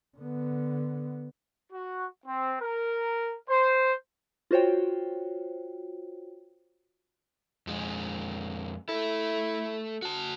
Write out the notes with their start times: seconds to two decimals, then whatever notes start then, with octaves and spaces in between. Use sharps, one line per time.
0.18 D3 B3
1.73 F#4
2.26 C4
2.61 A#4
3.50 C5
4.51 F4 F#4 C5 C#5 G5
7.67 F2 G#3
8.89 A3 E4 A4
10.02 F#4 A5